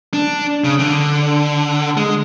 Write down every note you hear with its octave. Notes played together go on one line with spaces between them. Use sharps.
D4
C#3
D3
G#3